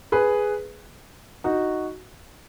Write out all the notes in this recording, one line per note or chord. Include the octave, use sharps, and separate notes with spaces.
G#4 B4
D#4 F#4